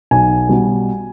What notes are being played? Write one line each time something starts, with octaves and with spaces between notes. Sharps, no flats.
B1 G#5
B2 G3